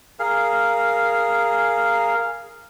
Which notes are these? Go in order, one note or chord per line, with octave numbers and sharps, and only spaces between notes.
G#4 A#4 F5